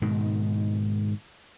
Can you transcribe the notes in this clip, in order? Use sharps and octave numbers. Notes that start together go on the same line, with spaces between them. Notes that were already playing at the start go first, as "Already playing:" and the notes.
G#2 B2 D#3